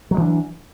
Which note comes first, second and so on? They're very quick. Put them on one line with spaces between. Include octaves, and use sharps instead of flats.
F#3 G#3 E3 D4